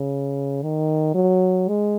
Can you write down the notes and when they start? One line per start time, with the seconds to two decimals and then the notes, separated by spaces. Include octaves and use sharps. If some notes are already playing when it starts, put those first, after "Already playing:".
Already playing: C#3
0.63 D#3
1.14 F#3
1.68 G#3